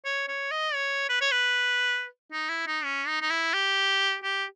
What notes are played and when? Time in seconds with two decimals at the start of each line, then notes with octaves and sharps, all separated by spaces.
0.05 C#5
0.28 C#5
0.51 D#5
0.74 C#5
1.09 B4
1.21 C#5
1.31 B4
2.32 D#4
2.49 E4
2.67 D#4
2.84 C#4
3.07 D#4
3.21 D#4
3.30 E4
3.54 G4
4.24 G4